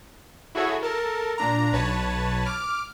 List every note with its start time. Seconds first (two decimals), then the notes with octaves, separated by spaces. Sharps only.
0.55 E4 F#4 G#4 A4 C#5
0.81 A4 A#4 A5
1.38 A#2 D4 A#5
1.72 B1 B4 C#5 A5
2.45 D6 F6